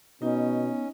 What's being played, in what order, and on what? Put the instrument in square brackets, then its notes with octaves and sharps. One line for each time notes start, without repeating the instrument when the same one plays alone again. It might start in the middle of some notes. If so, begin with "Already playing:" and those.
[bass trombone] B2 [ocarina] B3 [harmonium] C#4 [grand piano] D#4